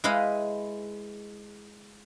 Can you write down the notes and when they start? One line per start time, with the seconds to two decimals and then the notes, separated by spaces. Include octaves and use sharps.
0.04 G#3 E4 B4 D#5 F5